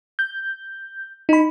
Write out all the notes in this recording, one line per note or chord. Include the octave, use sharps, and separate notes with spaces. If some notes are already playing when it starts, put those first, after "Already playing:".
G6
D#4 B5